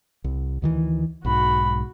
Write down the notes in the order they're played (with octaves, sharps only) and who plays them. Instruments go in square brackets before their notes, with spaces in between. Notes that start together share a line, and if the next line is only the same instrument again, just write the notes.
[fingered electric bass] C2
D2 D#3 E3
[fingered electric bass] B1 G#2 [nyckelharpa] F#4 B5